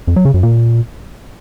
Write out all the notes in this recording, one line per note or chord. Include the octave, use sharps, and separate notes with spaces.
F2
F#3
C#3
F#2
A#2